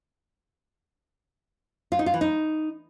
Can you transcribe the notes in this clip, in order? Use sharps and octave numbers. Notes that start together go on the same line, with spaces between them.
F4
D#4
F4
E3
D#4